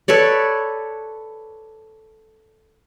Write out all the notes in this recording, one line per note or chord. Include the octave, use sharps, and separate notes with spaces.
A4 B4 C#5 D5